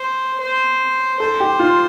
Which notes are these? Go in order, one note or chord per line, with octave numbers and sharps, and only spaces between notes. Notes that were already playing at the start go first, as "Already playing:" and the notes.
Already playing: C5
C5
A4 C5
G4
F4